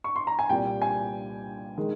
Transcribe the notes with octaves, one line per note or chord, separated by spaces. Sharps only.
C#6
C6
A#5
G#5
C2 A#2 G3 G5
G#5
D#3 G#3